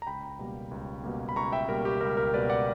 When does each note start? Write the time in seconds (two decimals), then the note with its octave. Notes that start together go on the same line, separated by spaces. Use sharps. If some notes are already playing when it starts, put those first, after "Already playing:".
0.02 A#5
0.07 C#2 G5 B5
0.39 B2 G3 A#3
0.71 C#2
1.04 B2 G3 A#3
1.29 B5
1.36 C#2 A#5 C#6
1.52 E5 G5
1.69 B2 G3 A#3 A#4
1.85 G4
2.01 C#2 A#4
2.17 A#4
2.34 B2 G3 A#3 B4 D5
2.49 D5 F#5